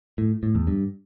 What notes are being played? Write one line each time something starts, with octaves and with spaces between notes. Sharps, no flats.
A2
A2
E2
G2